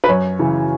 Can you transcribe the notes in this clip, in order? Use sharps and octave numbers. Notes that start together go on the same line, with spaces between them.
B4
F#2 C#5
C#3 E3